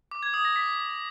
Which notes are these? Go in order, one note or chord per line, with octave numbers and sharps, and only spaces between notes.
D6
G#6
D#6
A#6
B6